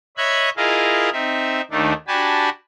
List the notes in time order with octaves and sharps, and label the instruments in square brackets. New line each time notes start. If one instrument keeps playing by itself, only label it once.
[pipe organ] C#5 D#5 E5 B5 F#6 G#6
E4 F4 G#4 A#4 D#5 F5
C4 D#4 E5
D#2 D#3 A3 D4 D#4
D4 F#4 G4 G#5 A5 B5